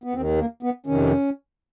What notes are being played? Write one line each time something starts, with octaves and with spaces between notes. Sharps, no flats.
B3
D#2 D#3 C4
A#3
B3
F2 C3 D#3 C#4